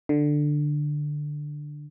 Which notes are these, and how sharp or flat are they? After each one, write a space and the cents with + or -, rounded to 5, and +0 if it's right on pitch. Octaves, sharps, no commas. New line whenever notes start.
D3 +10